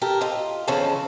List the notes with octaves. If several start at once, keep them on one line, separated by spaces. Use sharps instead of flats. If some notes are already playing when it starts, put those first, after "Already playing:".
G4 A4 A#4
F4 D#5
E2 C#3 F3 A4 D#5